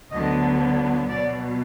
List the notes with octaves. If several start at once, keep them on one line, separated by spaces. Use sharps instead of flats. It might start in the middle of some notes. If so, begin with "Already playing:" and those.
D2 D3 F#3 B3 D#5
B2 F#3 B3 D5